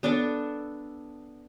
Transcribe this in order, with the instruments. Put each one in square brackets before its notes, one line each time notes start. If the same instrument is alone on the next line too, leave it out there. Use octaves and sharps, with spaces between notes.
[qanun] B3 D4 A4